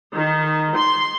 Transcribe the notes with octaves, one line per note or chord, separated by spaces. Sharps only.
D#3
C6